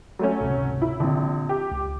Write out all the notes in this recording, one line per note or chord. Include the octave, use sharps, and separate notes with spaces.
F#3 A3 C#4
G#1 C#2 C3
E4
A#1 D3 C4
G4
C#2